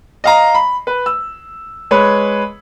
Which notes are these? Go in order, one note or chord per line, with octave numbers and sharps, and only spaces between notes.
D#5 F5 A#5
B5
B4
E6
G#3 B4 C#5